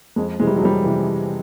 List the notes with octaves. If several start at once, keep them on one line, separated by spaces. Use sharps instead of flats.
F2 G#3
C3 E3 G#3
G3
F#3
F2 G3
C3 E3